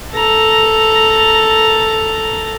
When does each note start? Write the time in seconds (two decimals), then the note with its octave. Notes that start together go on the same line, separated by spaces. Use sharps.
0.13 A4 A#5